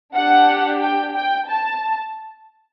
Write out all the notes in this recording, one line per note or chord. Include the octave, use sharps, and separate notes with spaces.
D4 G4 F#5
G5
G5
A5